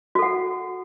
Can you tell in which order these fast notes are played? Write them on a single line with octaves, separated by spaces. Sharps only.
F#4 A4 F#5